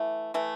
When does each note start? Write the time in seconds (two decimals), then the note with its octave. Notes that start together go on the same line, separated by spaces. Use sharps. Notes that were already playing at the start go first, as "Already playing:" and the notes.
Already playing: E3 A3 E4
0.34 E3 A3